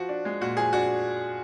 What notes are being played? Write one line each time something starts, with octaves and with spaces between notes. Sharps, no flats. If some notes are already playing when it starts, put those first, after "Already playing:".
Already playing: F3 F#4
D4
G#3
A#2 F#4
F3 G#4
D4 F#4